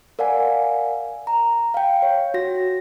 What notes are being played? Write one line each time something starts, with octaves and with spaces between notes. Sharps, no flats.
A#4 D5 F5 F#5 G#5
A#5
F5 G5
C#5
F#4 A#6